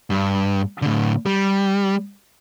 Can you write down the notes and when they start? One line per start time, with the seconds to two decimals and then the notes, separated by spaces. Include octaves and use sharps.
0.10 G2
0.82 A2 D3
1.26 G3